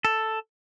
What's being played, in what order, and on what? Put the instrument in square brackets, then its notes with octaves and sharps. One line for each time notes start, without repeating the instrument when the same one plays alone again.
[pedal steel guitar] A4